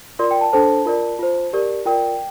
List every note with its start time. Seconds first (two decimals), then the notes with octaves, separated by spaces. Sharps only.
0.19 F4 A#4 D5 C6
0.31 G5
0.41 A5
0.53 D4 A4 C5 A5
0.86 F4 A#4 D5
1.19 F4 C5
1.53 G4 A#4 D5
1.86 F4 A#4 D5 G5